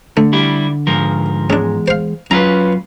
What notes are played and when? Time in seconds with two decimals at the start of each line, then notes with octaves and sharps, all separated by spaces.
0.17 D3 A3
0.33 G3 E4 G4
0.87 G#2 F3 A#4
1.50 E2 G#3 C#4 D4
1.88 C5 F5
2.31 F#2 C#4 F4 B4 A#5